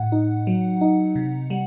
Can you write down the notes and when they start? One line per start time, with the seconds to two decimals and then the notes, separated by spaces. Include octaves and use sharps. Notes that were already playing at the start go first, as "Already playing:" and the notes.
Already playing: A2 F#5
0.12 D#4
0.47 F#3
0.81 D#4
1.16 C3
1.50 G3